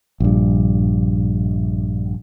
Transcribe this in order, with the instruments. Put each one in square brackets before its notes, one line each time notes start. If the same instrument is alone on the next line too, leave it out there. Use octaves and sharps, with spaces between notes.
[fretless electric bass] A#1 G2